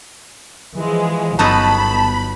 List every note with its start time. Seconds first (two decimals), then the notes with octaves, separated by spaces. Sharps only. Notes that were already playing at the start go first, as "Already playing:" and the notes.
0.76 E3 F3 G#3
1.39 G1 F#3 B3 D#4 A5 B5